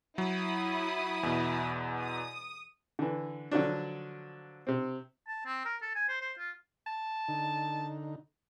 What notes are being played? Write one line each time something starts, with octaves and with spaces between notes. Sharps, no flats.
F#3 E4 D#6
E2 B2
D#6
D3 E3
D3 F3 F#3 D4
C3 C4
A5
C4
A#4
A4
G#5
C5
C5
F4
A5
D3 D#4